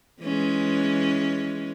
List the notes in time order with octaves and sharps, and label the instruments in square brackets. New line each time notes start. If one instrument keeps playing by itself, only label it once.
[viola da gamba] E3 G#3 C#4